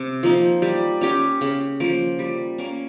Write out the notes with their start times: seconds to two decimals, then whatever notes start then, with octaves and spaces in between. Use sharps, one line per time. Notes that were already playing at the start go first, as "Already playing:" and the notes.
Already playing: C3
0.23 F3 A#3 D#4
0.62 G3
1.01 C#4 G4
1.41 C#3
1.80 F3 A#3
2.19 G3
2.58 A#3 C#4